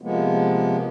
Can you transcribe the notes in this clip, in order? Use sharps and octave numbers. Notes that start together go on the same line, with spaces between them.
C3 F3 G#3 A#3 B3